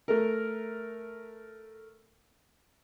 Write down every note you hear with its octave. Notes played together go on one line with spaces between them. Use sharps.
A3 A#4